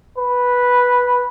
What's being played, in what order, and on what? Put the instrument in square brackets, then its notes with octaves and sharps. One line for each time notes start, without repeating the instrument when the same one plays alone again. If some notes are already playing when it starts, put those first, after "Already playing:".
[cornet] B4